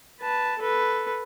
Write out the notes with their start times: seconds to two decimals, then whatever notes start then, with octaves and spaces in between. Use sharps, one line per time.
0.20 B4 A5
0.59 A4 B4